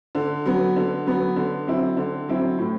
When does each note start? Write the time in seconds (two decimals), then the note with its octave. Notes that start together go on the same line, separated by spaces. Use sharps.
0.15 D3
0.46 F#3 B3
0.76 D3
1.06 F#3 B3
1.36 D3
1.67 F#3 C4 E4
1.97 D3
2.28 F#3 C4 E4
2.58 A2